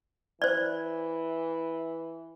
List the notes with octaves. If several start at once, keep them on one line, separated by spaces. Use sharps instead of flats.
E3 C5 D5